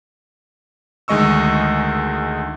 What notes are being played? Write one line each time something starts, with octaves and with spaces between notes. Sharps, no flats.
D2 D#3 G#3 D#5 C#6 E6